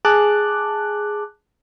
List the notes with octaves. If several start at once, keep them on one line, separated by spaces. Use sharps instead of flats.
G#4 A5 D6 F#6